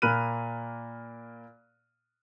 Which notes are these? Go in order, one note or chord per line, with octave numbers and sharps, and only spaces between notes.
A#2 A#3 B5 F6 F#6 D#7